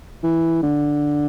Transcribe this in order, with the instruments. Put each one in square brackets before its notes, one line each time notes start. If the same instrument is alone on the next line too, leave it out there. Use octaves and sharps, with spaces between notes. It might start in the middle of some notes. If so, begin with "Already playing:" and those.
[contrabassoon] E3
D3